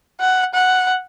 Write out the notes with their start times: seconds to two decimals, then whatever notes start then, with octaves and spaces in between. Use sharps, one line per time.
0.20 F#5
0.54 F#5